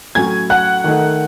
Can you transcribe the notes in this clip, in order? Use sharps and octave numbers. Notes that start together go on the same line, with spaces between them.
A2 F#3 C#4 G#5 G#6
F#5 F#6
D#3 A3 D#4